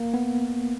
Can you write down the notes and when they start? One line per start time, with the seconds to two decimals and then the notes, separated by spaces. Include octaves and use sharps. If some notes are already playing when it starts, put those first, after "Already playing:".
Already playing: A#3
0.14 B3